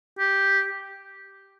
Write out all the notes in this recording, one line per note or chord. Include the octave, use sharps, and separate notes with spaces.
G4